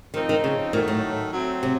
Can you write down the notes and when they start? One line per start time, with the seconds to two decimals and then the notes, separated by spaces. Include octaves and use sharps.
0.14 D#3 F3 C4 D#4
0.29 D#3
0.44 C#3
0.73 A#2 D#3 F#3 A3
0.88 A2
1.32 F#3 A3 C4
1.63 C3